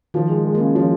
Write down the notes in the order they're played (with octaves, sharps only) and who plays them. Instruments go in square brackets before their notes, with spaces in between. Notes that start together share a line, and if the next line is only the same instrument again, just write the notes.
[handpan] D#3 [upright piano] F3
[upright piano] G#3
G#3
[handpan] A#3
[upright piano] C#3
[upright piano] F3 [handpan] C#4